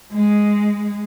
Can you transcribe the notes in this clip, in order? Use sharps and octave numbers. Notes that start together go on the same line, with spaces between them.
G#3